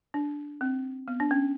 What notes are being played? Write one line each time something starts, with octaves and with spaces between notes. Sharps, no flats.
D4
C4
B3
D4
C#4